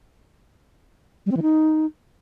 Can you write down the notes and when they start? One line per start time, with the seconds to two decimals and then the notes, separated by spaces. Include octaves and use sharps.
1.26 G3
1.31 C4
1.37 E3
1.42 D#4